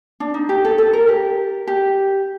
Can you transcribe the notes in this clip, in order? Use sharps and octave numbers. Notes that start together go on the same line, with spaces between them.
D4
D#4
G4
A4
A4
A#4
G4
G4